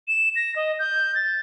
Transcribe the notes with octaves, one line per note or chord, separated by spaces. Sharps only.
E7
A#6
D#5
G6
A6